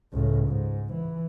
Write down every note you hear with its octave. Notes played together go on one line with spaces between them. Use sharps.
C#2 A2
G#2
E3